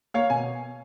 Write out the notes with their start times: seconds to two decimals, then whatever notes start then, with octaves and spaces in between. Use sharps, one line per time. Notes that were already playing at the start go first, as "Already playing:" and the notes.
0.14 A#3 C#5 F5
0.30 B2 G#5